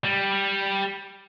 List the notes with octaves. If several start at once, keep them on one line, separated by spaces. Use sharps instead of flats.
G3